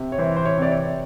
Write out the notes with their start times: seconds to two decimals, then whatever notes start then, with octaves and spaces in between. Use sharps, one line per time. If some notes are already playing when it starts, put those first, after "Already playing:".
Already playing: C3
0.12 C#5
0.18 E3 C5
0.36 C5
0.45 C#5
0.58 C3 D5
0.71 C#5